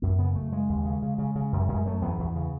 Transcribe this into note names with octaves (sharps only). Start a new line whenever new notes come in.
F#2 B3
C#3 B3
F#2 A3
C#3 G#3
D#2
C#3
C#3
C#3
C#3
F#2
F#2
G#3
F#2 A3
E2 B3
E2
C#3